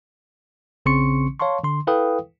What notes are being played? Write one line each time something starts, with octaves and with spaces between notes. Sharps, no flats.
A#1 C#3 C4 C6 C#6 C#7
C#5 F5 A5 C6 C#6
D3 C6
E4 A4 B4 F5 G5 D#6